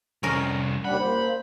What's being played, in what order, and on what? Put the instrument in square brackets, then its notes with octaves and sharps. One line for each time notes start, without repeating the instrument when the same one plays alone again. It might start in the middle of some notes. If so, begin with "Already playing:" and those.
[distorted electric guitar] C2 F2 [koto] C#4 A#4
[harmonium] D#2 G3 D4 [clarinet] F#5 [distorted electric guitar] B5
[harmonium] A#2 [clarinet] C5